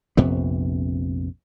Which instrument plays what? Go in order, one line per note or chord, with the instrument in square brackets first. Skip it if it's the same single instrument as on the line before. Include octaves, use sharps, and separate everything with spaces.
[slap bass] A#1 F2 C3 B3